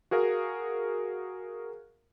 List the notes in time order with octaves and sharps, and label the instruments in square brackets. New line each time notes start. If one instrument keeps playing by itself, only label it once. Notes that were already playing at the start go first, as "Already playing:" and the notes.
[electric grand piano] F#4 G#4 A#4 F5